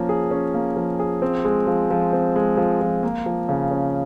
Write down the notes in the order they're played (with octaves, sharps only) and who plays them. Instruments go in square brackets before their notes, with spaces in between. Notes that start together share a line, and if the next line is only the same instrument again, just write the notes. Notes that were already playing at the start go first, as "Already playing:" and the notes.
Already playing: [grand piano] F3 A#3 C#4
G#4
C#4
A#3
F3
G#4
C4
G#3
F3
F3
C4
G#3
F3
F3
A#3
F3
C#3
C#4